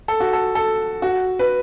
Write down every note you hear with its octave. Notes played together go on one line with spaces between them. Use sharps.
A4
F#4
A4
A4
F#4
B4